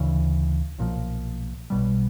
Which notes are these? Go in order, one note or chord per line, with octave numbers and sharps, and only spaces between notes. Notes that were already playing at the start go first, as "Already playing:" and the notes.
Already playing: D2 C#3 E3
B1 A#2 F3
B1 B2 G3